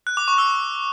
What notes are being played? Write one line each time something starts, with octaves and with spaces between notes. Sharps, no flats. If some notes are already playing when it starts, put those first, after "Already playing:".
F#6
D6
C#6
E6